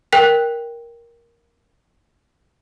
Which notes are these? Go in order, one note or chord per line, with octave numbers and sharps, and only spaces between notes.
A#4 G5 F#6 B6